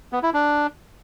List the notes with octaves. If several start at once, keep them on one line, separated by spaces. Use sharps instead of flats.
B3
E4
D4